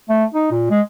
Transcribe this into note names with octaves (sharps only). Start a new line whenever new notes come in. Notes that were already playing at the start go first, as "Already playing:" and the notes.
A3
D#4
A#2
G#3